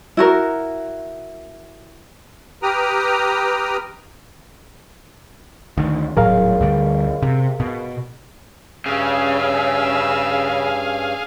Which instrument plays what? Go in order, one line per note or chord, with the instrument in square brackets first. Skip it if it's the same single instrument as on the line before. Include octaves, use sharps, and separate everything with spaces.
[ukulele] E4 F#4 A#4
[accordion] G4 B4 G5 A#5 D#6 F6
[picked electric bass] D2 D#3
[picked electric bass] D#1 A2 F#3 [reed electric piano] G#4 A#4 F5
[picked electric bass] D2 D3 G3
C3
B2
[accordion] G2 C#4 [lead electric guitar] C#3 [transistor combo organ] G#4 F5 [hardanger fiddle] E5